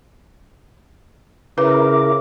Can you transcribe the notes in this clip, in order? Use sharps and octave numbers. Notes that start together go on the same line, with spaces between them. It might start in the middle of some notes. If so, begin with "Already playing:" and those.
C#3 E4 A#4 B4 D6